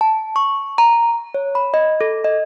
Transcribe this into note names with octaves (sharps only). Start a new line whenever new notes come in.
A5
C#6
A#5
C#5
B5
D#5
A4
D#5